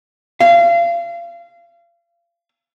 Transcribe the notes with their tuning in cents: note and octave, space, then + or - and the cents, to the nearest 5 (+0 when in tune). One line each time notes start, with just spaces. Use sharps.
F5 -30